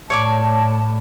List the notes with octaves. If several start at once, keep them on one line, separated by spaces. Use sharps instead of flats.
A2 C#5 D5 A5 D6